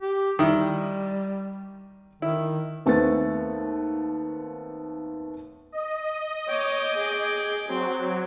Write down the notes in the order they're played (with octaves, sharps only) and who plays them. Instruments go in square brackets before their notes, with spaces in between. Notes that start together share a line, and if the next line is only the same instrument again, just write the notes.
[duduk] G4
[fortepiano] D#3 E4 [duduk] G3
[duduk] D#3 [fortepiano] E4
[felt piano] D#2 A3 B3 C4 A6
[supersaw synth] D#5
[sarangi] C#5 [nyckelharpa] G5 D6
[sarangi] G#4
[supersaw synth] F#3 [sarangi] C4